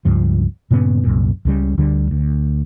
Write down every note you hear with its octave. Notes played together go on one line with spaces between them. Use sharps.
C#2 G2 F3
G2 A#2 C#3 B3
C2 F#2 A#2
C#2 C#3 G3
D2 D3 G3
D2